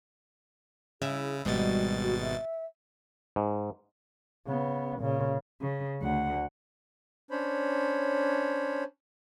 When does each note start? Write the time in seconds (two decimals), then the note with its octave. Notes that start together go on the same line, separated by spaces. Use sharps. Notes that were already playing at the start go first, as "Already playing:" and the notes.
1.02 C#3 E4 G#4
1.45 G#1 B2 G3 G#3 F#4 A6
2.03 F#4
2.22 E5
3.36 G#2
4.46 C#3 B3
5.00 A#2 C#3
5.61 C#3
6.01 D2 F#5
7.31 C#4 D4 C5 C#5 B5